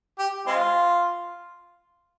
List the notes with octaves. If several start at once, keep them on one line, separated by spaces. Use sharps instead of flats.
G4
G#3 C4 F4